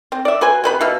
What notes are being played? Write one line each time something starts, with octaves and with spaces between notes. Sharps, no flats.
C4
D5 E5
F#4 B4 C5 G#5
C3 B4 B5
B2 E5 F5